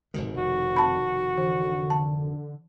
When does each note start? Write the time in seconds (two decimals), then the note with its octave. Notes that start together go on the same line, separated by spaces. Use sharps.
0.14 F1 G#2 B2 D#3
0.37 F2 F#4
0.76 A5 B5
1.38 D3 E3
1.90 A5